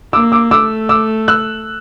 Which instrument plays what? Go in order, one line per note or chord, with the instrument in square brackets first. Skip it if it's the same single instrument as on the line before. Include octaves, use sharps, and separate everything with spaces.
[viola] A#3 [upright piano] D6 E6
[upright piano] D6 E6
[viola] A3 [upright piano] D6 E6
[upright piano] D6 E6
E6 F#6